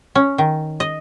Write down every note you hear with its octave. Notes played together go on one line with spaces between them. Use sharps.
C#4
D#3
D#5